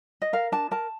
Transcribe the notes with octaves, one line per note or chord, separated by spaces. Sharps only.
D#5
A#4 F5
D4 A5
A#4 A5